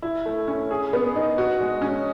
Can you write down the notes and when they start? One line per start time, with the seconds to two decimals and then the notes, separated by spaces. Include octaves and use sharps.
0.02 E4
0.26 A3
0.48 C#4
0.71 G#4
0.93 B3
1.16 D#4
1.38 F#4
1.60 G#3
1.82 C#4